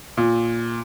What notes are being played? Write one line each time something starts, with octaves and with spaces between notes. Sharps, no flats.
A#2